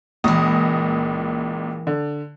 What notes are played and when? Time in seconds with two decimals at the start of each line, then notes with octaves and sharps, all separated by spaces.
0.24 C#2 A#2 E3 A#4 D#6
1.87 D3